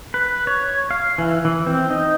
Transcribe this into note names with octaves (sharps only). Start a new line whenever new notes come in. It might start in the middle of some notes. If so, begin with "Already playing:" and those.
B4
C#5
F5
E3
E3
C4
D#4